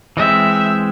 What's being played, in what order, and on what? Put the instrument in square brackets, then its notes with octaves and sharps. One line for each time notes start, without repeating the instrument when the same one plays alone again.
[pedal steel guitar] E3 G#3 C4 [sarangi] E5